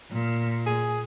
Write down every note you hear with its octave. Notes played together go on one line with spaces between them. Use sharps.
A#2
G#4